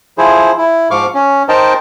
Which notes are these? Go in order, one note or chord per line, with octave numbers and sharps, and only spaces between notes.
F3 E4 G#4 C5
E4
G#2 F3 F5 C#6 D6 F6
C#4
D#4 A#4 C5 D#5 G5 A5